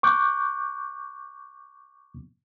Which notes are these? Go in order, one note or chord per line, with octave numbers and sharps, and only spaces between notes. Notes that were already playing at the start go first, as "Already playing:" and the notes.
C#6 D6 F#6 G6